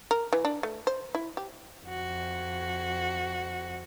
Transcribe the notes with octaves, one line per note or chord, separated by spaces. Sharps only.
A#4
E3
D4
A3
C5
E4
G4
F2 F#4